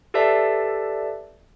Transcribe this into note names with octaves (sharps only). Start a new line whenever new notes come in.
G4 A4 B4 D5 E5 A5